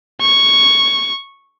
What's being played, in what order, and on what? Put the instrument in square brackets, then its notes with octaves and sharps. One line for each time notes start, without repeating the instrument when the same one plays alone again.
[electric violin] C#6